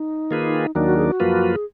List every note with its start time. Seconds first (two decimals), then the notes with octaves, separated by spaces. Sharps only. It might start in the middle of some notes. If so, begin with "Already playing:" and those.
Already playing: D#4
0.31 D#3 A#3 F4 G#4 B4
0.75 D#2 D#3 F#3 A#3 D4 D#4
0.87 F#4
0.97 G#4
1.09 F#4
1.20 F#2 F3 A#3 F4 B4
1.54 G#4